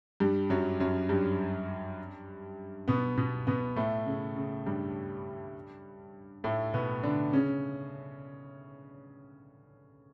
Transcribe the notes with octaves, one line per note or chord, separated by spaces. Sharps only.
G2 G3
F#2 F#3
F#2 F#3
G2 G3
B2 B3
B2 B3
B2 B3
A2 A3
C#3
C#3
G2 G3
A2 A3
B2 B3
D3 D4
C#3 C#4